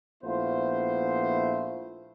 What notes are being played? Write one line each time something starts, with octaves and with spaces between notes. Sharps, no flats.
A#1 A3 B3 E4 F4 C5